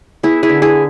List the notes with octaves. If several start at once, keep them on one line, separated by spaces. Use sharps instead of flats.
B3 E4 G#4
E4 G#4
D3
E4 G#4